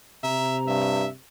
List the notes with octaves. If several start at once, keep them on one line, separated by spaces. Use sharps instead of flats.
C3 E5 A#5
G2 E5